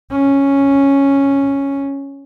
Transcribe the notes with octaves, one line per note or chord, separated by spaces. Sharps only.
C#4